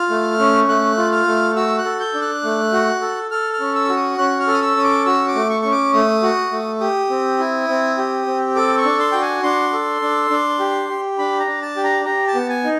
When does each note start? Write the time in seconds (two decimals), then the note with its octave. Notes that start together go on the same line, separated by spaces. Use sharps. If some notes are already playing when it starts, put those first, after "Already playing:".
Already playing: F4 F6
0.10 A3
0.39 C#4
0.68 A3 F#6
0.97 F4
1.12 F6
1.27 A3
1.56 F#4 E6
1.78 F#6
1.85 A4
2.00 G6
2.14 D4
2.22 F#6
2.44 A3
2.73 F#4
3.02 A4
3.31 A4 F6
3.53 F6
3.60 C#4
3.75 E6
3.89 F#4
3.97 D#6
4.18 C#4 F#6
4.40 F6
4.47 A4
4.54 D#6
4.62 E6
4.77 C#4 D#6
4.84 D6
5.06 F#4 E6
5.28 D6
5.35 A3
5.49 C#6
5.62 C#4 C#6
5.72 D6
5.93 A3 D#6
6.23 F#4
6.51 A3
6.81 G4 D#6
7.10 C4
7.39 E4
7.69 C4
7.98 G4
8.27 C4
8.56 A4 D6
8.78 C#6
8.85 D4
9.00 C6
9.12 F#4 G5
9.22 G#5
9.43 D4 C6
9.73 A4
10.02 D4
10.30 D4
10.60 G4
10.89 G4
11.18 D4 B5
11.40 A#5
11.47 D4
11.62 A5
11.76 G4
11.84 A#5
12.05 G4 A#5
12.27 A5
12.34 B3
12.49 G#5
12.64 D#4